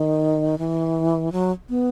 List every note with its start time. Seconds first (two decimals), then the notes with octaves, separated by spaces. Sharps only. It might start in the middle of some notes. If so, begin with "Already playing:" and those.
Already playing: D#3
0.58 E3
1.32 F#3
1.70 B3